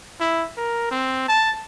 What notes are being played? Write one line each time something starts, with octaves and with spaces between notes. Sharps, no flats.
E4
A#4
C4
A5